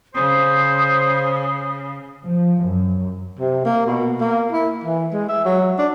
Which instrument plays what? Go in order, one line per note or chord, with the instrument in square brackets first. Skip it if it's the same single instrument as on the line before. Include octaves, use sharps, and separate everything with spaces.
[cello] C#3 [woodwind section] C5 [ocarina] D#6
[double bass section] F3
F#2
[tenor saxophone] C3
A#3
B2
A#3
E4
E3
G#3
E5
F#3
D4